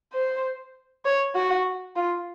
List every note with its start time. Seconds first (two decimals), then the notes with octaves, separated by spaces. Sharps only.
0.13 C5
1.05 C#5
1.35 F#4
1.96 F4